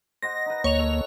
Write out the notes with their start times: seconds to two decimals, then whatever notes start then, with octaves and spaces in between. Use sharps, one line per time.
0.22 C5 D#5 F#5 A#6
0.46 D#4 B4
0.64 D2 A#3 C#5 F7
0.79 A4